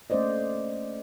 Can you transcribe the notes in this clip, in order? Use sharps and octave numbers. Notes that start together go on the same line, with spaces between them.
A3 A#3 C#4 C5 D5 D#5